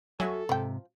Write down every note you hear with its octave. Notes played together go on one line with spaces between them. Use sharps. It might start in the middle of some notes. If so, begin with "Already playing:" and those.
F#3 F#4 A4 E5 G#5
G#2 C3 F3 G5